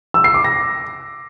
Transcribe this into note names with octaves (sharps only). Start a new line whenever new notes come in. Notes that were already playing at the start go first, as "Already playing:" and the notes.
E6
C7
D6
A#6